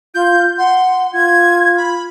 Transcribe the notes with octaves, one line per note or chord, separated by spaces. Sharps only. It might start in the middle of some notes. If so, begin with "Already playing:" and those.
F4 G6
F#5 C6
F4 G#6
B5